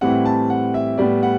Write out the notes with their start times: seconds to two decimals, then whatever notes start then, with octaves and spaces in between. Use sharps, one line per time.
0.01 A2 E3 G3 C4 F#5
0.25 A5
0.50 F#5
0.74 E5
0.98 A2 G3 B3 D5
1.23 F#5